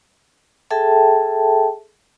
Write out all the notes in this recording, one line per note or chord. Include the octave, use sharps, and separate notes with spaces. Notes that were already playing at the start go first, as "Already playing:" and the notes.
G#4 A4 E5 G5 A5